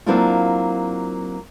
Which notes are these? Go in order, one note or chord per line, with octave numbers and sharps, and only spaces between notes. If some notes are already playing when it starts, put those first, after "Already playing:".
F#3 A#3 C4 D4 E4 F4